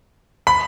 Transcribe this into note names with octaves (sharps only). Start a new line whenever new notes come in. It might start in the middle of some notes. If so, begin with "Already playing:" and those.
B5